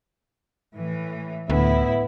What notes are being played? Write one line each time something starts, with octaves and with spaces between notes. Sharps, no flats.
A2 E3
D2 A2 B3 E4